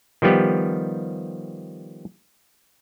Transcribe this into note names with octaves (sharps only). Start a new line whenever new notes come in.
D#3 F3 G3 B3 G4